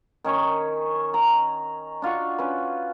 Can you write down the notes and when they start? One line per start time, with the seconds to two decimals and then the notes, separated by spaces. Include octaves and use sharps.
0.24 D#3 C#4 C#5
1.14 A#5
2.02 D4 F4 F#4 C#6
2.38 C#4 B4